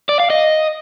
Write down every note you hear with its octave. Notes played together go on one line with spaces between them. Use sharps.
D5
F5
D#5